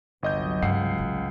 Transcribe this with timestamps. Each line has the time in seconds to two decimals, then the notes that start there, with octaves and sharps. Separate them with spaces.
0.23 G1 C2 F#3 D#5 G6
0.62 C#2 G2 F#5 C7
0.98 A1 A2